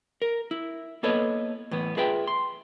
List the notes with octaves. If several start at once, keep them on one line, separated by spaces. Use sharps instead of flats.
A#4
E4
A#3 B3 A4 B4 C#5 D#5
A2 E3 B3
F4 G#4 B4 E5 G5
C6